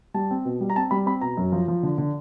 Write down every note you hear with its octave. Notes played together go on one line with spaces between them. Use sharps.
G3 A5
C4
B2
G3
A#5
C4 A5
G3 B5
C4 B5
B2 A#5
F#2
F3
F3
D3
D3